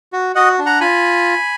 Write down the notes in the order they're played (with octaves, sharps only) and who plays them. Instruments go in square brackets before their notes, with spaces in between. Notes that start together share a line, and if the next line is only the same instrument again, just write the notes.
[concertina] F#4
F#4 D#5 F#5
D4
F#5 A#5
F4 G#5 B5